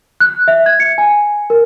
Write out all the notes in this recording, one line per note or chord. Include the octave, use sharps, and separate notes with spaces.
F#6
E5
G#6
C#7
G#5
A#4